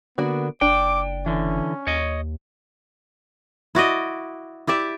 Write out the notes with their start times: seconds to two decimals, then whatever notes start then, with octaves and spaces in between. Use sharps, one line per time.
0.18 D3 A#3 B3 D4 F#4
0.61 F#1 D4 G5 D6
1.26 D3 E3 C#4
1.87 D#2 C#5 D#5
3.75 E4 F#4 D5 D#5
4.67 E4 G4 D5 E5